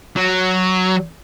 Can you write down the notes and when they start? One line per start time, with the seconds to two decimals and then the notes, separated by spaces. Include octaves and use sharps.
0.16 F#3